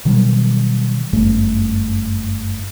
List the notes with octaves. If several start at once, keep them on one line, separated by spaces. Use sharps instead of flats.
B2 D#3 F#3 G3
G1 F#2 A3